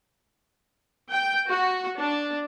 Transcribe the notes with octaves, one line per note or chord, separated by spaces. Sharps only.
G5
F#4
D4